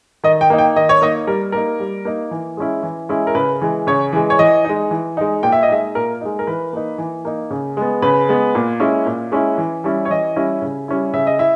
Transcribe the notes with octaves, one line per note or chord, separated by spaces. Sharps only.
D#3 D#5
G5
A#3 D#4
G5
D#3 D#5
C#5
A#3 D#4 D#5
G3 A#4
A#3 D#4 A#4
G3
A#3 D#4
E3
G#3 C#4 E4
E3
G#3 C#4 E4
A#4
C#3 B4
E3 G#3
C#3 C#5
E3 G#3
C#5
E3 D#5
G#3 D#4
E3
G#3 D#4
A#2 G5
E5
D#5
G#3 D#4 E5
A#2 A#4
G#3 D#4
A#4
E3 B4
A#3 D#4
E3
A#3 D#4
C#3
G#3 B3
C#3 B4
G#3 B3
A#2
G#3 C#4 E4
A#2
G#3 C#4 E4
E3
G3 C#4 E4
C#5
E3 D#5
G3 C#4 E4
C#3
G3 C#4 E4
C#3 E5
D#5
E4 E5